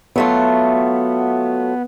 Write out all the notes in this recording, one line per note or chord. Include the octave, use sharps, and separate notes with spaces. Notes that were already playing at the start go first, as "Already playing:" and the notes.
F#3 A3 B3 F4